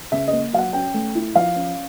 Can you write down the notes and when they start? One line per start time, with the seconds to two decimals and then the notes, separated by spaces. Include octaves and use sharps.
0.12 C#3 E5
0.28 A#3 D#5
0.53 F#3 F5
0.59 F#5
0.73 C#4 G5
0.94 A3
1.15 E4
1.35 F3 F5
1.56 C#4